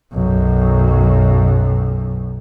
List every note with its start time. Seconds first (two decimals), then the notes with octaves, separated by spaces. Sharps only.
0.13 B1 F#2